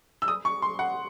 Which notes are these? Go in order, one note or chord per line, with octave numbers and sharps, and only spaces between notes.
E6
D#6
C#6
C6
F#5